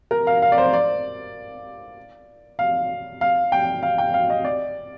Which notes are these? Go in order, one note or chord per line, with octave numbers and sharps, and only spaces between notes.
A#4
F5
F5
D5
C5
D5
F5
F5
G5
F5
G5
F5
D#5
D5